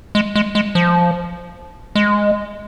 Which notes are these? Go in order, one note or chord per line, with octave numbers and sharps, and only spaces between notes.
G#3
G#3
G#3
F3
G#3